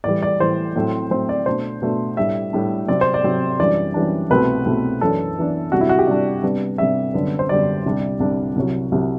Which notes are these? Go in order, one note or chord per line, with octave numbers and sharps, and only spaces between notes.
A2 E3 G3 D5
D5
A2 E3 G3 C5
A2 F#3 A3 C4
A2 F#3 A3 C4 C5
D5
B2 A3 D4 C5
B2 A3 D4
A2 G3 D4 E5
A2 G3 D4
C3 F#3 C4 D5
C5
D5
C3 F#3 C4
F#2 E3 G3 D4 D5
F#2 E3 G3 D4
C2 B2 A3 C4 B4
C2 B2 A3 C4
F#2 E3 B3 D4 A4
F#2 E3 B3 D4
C3 G3 D4 F#4
E4
F#4
G4
C3 G3 D4 D5
C3 G3 B3 D4
C3 G3 B3 D4 E5
F#2 D3 G3 B3
C5
F#2 D3 G3 B3 D5
C2 C3 G3 D4
C2 C3 G3 D4
C2 C3 F#3
C2 C3 F#3